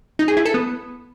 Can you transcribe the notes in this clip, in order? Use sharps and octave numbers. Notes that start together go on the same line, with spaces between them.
D#4
G#4
E4
A4
B3